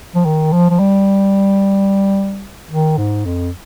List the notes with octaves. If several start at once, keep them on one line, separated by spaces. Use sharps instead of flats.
F3
D#3
F3
F3
G3
D#3
G#2
F2